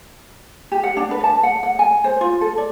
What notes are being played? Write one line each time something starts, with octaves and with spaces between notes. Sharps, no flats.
G4
F#5
D4
B4
A5
F#5
F#5
G#5
C5
F4
A4
D5